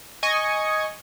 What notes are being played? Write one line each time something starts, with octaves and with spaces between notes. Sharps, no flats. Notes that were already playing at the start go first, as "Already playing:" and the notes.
D#5 G#5 C#6